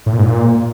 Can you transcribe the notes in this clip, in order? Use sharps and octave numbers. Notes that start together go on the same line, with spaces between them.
A2
A#2
G#2
A#2